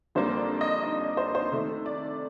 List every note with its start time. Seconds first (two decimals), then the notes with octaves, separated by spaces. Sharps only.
0.15 F2 D3 G3 A#3 C5
0.38 D5
0.61 D#5
0.83 D#5
1.00 D5
1.17 C5
1.35 C5
1.52 C3 D#3 A3
1.86 D5